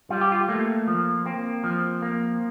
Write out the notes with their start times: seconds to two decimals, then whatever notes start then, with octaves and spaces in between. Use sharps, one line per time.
0.10 G3 F4
0.21 G4
0.32 F4
0.48 A3 A#3
0.88 F3
1.26 A#3 C4
1.64 F3
2.02 A#3